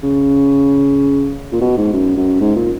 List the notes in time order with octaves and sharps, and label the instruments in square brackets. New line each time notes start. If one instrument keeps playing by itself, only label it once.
[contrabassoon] C#3
A#2
B2
G#2
F#2
F#2
G#2
A#2